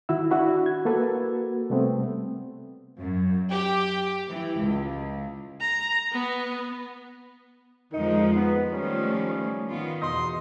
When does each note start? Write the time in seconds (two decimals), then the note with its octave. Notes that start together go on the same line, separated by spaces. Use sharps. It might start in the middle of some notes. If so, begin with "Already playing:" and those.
0.09 D#3 E4 F#4 E6
0.31 D4 E4 F#4 B5
0.66 G#6
0.85 A#3 F#4 A4 B4
1.70 C3 G3 A3 B3 C4
3.00 F#2
3.51 G4
4.29 E3
4.59 C#2
5.61 A#5
6.12 B3
7.93 F2 D3 D#3 F3 G#3 D#4
8.36 B3
8.72 D#3 F3 G3 A3 C#4
9.68 D#3 B3 F4
10.02 E2 B2 D#5 C6